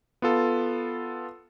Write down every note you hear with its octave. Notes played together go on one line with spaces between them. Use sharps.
B3 F4 A4